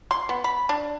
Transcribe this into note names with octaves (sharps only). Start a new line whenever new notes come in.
C6
B3
B5
D4